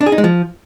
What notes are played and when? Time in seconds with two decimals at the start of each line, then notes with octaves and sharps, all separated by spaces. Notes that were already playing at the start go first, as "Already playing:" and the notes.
0.01 D4
0.06 G#4
0.12 D#4
0.18 G#3
0.24 F3